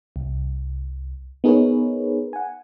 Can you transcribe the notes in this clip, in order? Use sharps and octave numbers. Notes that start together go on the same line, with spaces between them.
C2
B3 D#4 G#4 A#4 B4 C#5
F#5 G#5